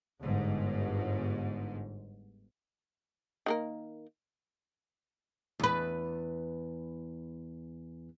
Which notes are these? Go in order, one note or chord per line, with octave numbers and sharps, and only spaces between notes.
G1 G#2
D#3 A#3 A#4
E2 B4